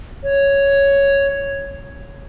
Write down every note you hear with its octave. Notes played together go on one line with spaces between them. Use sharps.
C#5